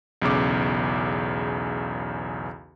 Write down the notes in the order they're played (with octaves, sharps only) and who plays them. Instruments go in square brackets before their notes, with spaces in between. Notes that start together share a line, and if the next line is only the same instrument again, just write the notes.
[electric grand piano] B1 E2 C#3 D6